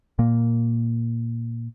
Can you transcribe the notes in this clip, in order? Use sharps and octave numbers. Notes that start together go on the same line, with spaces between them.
A#2 A#3